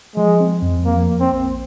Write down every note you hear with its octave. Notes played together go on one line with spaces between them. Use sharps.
F3 G#3
C4
F2
F3 A#3
A#3
C4
A#1